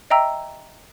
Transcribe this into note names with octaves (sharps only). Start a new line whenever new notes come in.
D#5 E5 G5 A#5 E6